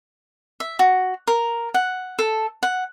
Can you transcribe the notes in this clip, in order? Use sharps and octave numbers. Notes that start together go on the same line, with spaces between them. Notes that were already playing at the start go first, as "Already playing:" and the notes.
E5
F#4
A#4
F#5
A4
F#5